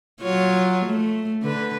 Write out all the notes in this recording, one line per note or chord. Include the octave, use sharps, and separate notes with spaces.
F#3 F4 C#5
A3
D3 B4